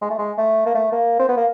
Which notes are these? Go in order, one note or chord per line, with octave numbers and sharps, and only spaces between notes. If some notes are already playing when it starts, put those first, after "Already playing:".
G#3
A3
G#3
A3
A#3
A3
A#3
C4
B3
A#3